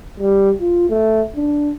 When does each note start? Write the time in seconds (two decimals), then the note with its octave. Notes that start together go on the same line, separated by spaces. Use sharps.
0.20 G3
0.60 F4
0.90 A3
1.36 D4